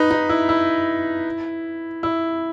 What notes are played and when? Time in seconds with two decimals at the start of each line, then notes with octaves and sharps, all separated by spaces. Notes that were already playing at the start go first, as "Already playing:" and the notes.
Already playing: D#4 B4
0.11 D#4
0.29 E4
0.49 E4
2.03 E4